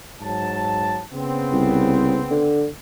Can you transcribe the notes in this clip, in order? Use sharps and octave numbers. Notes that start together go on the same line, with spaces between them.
G#2 F#3 A5
C#3 B3 C4
C2
D3